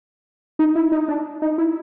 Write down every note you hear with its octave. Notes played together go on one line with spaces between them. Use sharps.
D#4
E4
D#4
D4
D#4
E4